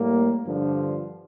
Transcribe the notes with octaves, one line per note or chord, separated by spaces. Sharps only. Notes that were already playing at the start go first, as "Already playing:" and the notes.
Already playing: A2 G3 A#3
G2 D3 F3